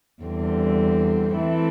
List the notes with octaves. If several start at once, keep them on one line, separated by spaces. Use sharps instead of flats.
E2 D3 G3 C4
E3 A3 C4 E4 A4